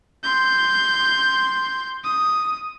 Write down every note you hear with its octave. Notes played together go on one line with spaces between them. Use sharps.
C6 G6
D#6